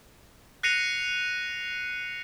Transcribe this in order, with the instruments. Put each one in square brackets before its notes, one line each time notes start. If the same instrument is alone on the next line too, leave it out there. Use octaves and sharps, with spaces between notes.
[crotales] F#6 A#6 C7 C#7 D#7 F7